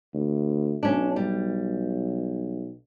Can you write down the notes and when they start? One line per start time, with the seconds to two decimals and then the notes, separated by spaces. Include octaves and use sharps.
0.14 D2
0.83 B1 C#4 D4
1.16 G3